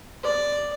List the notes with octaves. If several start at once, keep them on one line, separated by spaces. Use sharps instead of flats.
D5